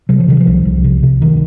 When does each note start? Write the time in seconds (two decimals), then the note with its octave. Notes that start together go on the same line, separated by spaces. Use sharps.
0.09 C3 F#3
0.20 F3
0.28 C3 D#3
0.40 F3
0.47 C2
0.65 C2
0.84 C3
1.03 C3
1.22 C2 D#3